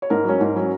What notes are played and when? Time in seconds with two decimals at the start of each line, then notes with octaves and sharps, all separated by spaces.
0.02 C#5
0.10 G#2 A#4
0.25 F#3 C#4
0.41 G#2
0.56 F#3 C#4